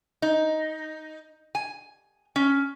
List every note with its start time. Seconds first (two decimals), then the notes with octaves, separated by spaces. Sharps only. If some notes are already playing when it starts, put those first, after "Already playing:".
0.22 D#4
1.55 G#5
2.36 C#4